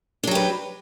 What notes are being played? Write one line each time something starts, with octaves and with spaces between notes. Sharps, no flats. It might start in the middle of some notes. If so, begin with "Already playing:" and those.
F#3 D4 G4 B4